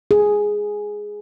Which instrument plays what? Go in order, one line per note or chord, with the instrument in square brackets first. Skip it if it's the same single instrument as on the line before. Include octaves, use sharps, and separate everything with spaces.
[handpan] G#4